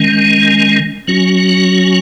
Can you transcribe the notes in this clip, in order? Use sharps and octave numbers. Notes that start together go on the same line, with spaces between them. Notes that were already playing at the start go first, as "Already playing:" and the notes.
Already playing: D#3 G#3 C#4
F#3 C#4 F#4